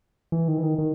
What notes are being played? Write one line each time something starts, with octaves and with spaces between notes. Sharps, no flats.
E3
D#3
E3
D#3
D#3